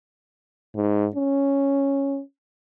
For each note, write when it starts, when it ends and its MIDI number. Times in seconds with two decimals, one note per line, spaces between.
0.76 1.07 44
1.15 2.21 61